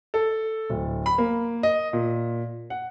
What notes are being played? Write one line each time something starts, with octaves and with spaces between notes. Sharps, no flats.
A4
D1
B5
A#3
D#5
A#2
F#5